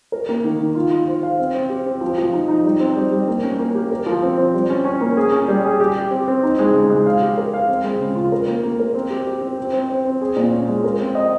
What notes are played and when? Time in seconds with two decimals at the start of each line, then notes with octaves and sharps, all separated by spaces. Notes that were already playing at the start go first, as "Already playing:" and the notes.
0.12 A#4
0.29 A#3
0.44 D#3
0.60 D#3
0.75 F4
0.91 F4
1.07 C5
1.23 F5
1.39 C4
1.54 C4
1.70 G4
1.86 C4
2.01 F3
2.18 F3
2.33 D#4
2.48 D#4
2.64 G3
2.80 C4
2.96 G3
3.12 G3
3.28 A#3
3.43 C#4
3.59 A#3
3.75 G4
3.91 A#4
4.06 F3
4.22 C4
4.38 C4
4.54 G3
4.70 C#4
4.85 C#4
5.01 A#3
5.17 G#4
5.32 C#4
5.48 G3
5.65 G#4
5.80 G4
5.96 G4
6.11 C4
6.28 C4
6.43 D#4
6.59 G#3
6.74 C#3
6.90 G#3
7.06 F5
7.22 G4
7.38 A#4
7.53 F5
7.68 C4
7.84 G#3
8.00 C#3
8.15 F4
8.32 A#4
8.47 A#3
8.63 A#3
8.80 A#4
8.95 C4
9.10 G4
9.27 G4
9.41 C4
9.58 C4
9.73 C4
9.90 C4
10.05 C4
10.21 G#4
10.36 A#2
10.52 C#4
10.68 G#3
10.84 A#4
10.99 C4
11.15 D#5